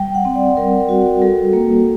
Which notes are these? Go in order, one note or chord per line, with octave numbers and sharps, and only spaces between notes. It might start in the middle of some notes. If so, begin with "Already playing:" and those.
Already playing: G3 G5
F#5
C4
D5
G3 A#4
F#4
G3 A4
A#3